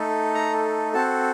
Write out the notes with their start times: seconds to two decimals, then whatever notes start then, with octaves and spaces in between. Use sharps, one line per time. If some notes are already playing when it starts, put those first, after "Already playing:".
Already playing: A3 D#4 A4
0.35 A#5
0.93 C4 F#4 A4 A5